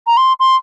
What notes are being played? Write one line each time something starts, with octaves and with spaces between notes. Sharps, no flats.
A#5
C6
C6